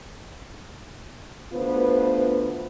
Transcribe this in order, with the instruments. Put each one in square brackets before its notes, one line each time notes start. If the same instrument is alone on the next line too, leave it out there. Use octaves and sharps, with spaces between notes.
[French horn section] D2 B3 F4 B4 C5